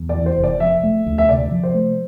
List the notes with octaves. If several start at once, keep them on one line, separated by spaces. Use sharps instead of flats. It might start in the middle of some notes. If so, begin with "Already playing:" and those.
Already playing: E2
D5
E3
C5
F1
D5
F3 E5
A3
D2
E5
C3 D5
F3
C5
A3